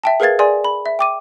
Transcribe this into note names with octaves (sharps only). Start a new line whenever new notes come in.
E5 G5 A5
G#4 A#4 B4 F5 G#6 A6
G#4 D5 G#5 C6
B5
E5
G5 D6 D#7